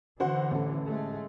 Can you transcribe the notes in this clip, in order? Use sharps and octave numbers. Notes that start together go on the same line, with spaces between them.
D3 E3 F#4 C5 F#5
A1 A4
G#3 A3